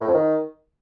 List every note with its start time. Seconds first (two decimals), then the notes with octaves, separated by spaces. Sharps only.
0.01 A2
0.07 F2
0.14 D#3